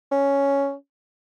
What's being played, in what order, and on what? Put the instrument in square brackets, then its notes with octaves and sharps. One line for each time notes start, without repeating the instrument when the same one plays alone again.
[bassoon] C#4